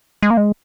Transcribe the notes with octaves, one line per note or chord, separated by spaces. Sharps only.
G#3
A#3
G#3